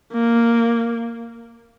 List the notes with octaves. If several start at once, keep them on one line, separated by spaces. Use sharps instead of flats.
A#3